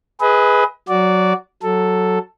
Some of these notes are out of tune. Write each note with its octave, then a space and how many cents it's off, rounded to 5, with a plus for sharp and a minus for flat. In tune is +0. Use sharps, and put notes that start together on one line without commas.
G#4 +0 B4 +0 D#5 +35
F#3 +0 F#4 +0 D5 -15
F#3 +0 A4 +0